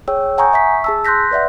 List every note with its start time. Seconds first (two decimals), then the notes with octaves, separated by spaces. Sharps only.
0.08 G#4 C#5 G5 E6
0.38 F#5 G#5 A#5 C#6 D#6 G6
0.53 E5 C#6 B6
0.84 G#4 A5 E6
1.05 C6 F#6 G6 A#6 B6
1.31 B4 D5 E5 F#5